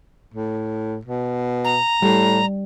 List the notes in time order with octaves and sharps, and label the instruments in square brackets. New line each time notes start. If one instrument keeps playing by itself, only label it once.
[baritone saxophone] A2
B2
[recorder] A#5
[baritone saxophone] A2 [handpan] G3